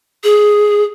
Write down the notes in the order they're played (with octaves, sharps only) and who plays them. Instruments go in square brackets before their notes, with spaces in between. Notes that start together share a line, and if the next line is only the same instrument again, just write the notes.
[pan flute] G#4